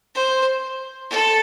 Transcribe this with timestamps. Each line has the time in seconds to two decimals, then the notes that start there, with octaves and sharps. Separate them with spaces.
0.15 C5
1.10 A4